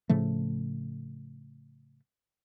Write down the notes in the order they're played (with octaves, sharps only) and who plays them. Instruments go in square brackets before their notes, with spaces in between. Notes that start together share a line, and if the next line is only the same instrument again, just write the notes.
[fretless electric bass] A2 C#3 F3 A3